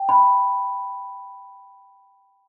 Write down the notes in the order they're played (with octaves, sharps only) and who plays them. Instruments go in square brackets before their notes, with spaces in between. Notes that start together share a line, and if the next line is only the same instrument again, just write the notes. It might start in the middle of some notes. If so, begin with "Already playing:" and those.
Already playing: [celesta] G5
B5